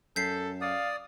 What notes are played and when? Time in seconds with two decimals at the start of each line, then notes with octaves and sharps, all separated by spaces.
0.16 F#2 A4 G6 B6 C7
0.61 D5 F5 D#6